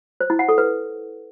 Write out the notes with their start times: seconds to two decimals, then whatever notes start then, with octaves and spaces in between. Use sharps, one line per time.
0.21 C5
0.30 E4
0.39 F#5
0.49 A4
0.58 B4